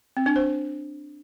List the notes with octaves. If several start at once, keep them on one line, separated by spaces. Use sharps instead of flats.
C4
D4
C5